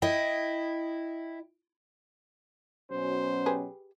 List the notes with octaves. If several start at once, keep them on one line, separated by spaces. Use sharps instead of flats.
E4 D#5 G5
B2 F#3 C#4 C5
G4 G#4 B4